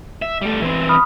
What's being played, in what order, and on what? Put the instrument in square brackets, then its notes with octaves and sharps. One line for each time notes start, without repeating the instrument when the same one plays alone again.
[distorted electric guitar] E5
G3 A3
E3 C4
[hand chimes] B5 D#6 F6